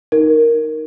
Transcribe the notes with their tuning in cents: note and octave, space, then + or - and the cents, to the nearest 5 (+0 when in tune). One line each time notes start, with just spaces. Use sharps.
D#4 +0 A#4 +0